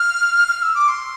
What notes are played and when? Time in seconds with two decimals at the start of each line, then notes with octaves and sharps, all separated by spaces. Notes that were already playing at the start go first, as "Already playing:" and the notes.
Already playing: F6
0.48 F6
0.63 E6
0.75 D6
0.88 C6